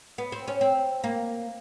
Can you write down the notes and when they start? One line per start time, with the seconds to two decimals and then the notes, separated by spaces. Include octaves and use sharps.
0.18 B3
0.32 C4
0.48 C#4
0.61 C4
1.04 A#3